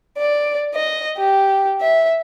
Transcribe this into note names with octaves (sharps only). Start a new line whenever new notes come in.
D5
D#5
G4
E5